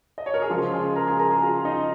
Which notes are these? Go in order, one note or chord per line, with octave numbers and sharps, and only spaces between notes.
D#5
C#5
A#4
G#4
C#3 F3 G#3 F4
G#3 G#4
A#4 A#5
G#4 G#5
A#4 A#5
G#4 G#5
F4 F5
D#4 D#5